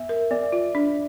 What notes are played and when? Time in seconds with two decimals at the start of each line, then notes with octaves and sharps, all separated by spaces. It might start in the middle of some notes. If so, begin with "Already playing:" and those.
Already playing: B3 E5
0.09 A#4
0.31 B3 D5
0.52 F4
0.75 D4